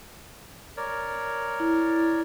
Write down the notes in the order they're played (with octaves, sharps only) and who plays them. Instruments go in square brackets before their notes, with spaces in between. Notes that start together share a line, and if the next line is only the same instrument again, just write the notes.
[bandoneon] A#4 C#5 D5
[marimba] E4